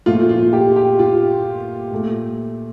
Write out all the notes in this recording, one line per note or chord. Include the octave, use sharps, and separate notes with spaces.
A#2 F3 A3 F4
F4
G4
G4
F4
A#2 A3